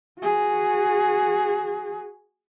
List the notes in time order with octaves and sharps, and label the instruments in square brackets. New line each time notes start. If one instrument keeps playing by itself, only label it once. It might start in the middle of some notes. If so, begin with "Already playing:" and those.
[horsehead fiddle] F#4 G#4